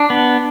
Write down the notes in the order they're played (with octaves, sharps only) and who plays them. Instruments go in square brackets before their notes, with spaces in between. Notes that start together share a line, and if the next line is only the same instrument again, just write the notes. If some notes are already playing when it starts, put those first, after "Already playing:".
Already playing: [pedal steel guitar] D4
B3